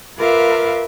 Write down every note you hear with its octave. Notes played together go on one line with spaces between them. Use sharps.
F4 A#4 B4 E5 F5 D6